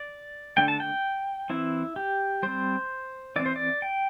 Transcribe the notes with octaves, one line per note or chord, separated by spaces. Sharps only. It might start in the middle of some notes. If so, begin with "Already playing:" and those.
Already playing: D5
D3 A3 D4 G5
A5
G5
E3 C4 E4
G4
G3 C4 C5
E3 C4 D5
C5
D5
G5